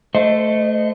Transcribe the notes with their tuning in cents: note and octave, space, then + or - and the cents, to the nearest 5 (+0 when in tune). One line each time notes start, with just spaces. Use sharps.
A3 +0 C5 -30 D#5 +0